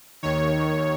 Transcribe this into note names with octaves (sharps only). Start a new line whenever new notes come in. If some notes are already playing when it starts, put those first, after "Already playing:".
D#2 D#3 C#5